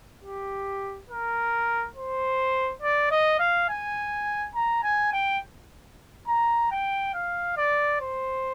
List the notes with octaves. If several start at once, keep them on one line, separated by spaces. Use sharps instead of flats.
G4
A#4
C5
D5
D#5
F5
G#5
A#5
G#5
G5
A#5
G5
F5
D5
C5